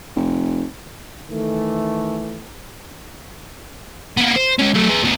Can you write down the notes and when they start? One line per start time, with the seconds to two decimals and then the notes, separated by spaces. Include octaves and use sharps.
0.16 F1
1.30 D#3 E3 A3
4.17 A#3 B3
4.36 C5
4.59 G#3 C#4
4.74 F#3 A3
4.89 G#4 B4
5.03 D2 B3